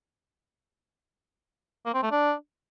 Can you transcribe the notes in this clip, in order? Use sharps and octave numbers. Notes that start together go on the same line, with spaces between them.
A#3
C4
A3
D4